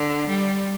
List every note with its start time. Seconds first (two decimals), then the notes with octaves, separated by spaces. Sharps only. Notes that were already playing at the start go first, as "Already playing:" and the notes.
Already playing: D3
0.28 G3